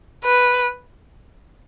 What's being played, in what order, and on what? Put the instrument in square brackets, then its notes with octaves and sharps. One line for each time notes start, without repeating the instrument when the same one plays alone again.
[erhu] B4